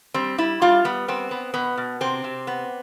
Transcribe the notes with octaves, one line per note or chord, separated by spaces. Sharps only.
G3 C4
G3 E4
G3 F4
G3 B3
B3 C4
B3
B2 B3
B2
C3 C4
C3
B3